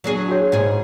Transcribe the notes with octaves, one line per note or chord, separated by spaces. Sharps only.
F#3 D4 G#4
F#4 C#5
G#2 G3 G#4